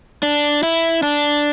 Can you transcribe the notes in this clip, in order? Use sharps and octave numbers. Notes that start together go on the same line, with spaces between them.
D4
E4
D4